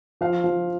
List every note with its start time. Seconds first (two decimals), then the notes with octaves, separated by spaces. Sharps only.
0.21 F3 F5
0.44 F3